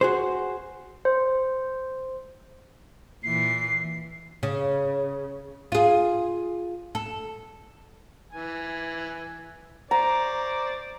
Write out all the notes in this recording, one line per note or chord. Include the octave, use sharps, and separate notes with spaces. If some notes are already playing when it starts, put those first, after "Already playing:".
F#4 G#4 C5
C5
A#2 E3 C7
C#3
F4 G#4
A4
E3 G#5
C5 D5 A#5